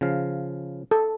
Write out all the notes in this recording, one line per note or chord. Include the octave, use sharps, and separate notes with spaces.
C#3 F3 F5
A4